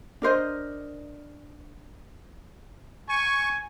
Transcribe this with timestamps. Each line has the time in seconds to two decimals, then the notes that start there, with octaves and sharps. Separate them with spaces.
0.22 D4 A#4 C5 D#5
3.09 G#5 C#6